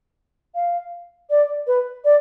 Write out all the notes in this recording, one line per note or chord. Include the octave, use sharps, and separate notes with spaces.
F5
D5
B4
D5